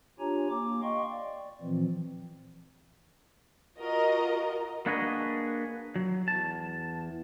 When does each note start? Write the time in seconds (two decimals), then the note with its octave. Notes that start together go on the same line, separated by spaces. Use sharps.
0.19 D4 F4 G4 C#5 G#5 A#5
0.50 A#3 D6
0.82 D#5 F5 G5 C6 C#6
1.11 D5
1.61 A#2 E3 F3 C4
3.79 F4 F#4 A#4 D#5
4.86 A#3 D4 F#4 G#4 B4 D#5
5.96 F#3
6.28 E2 A5